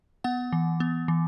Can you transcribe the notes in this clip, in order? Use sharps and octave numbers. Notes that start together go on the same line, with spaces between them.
B3 F#5
E3
B3
E3